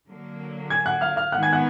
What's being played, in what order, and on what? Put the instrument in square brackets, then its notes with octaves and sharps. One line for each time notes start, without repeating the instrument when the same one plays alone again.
[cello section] D3 F#3 A#3
[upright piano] G#5 G#6
F#5 F#6
F5 F6
F5 F6
[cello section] D#3 G#3 B3 [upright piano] F#5 F#6
[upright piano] G#5 G#6
F#5 F#6